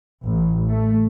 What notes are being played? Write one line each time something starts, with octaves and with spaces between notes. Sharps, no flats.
A1
A3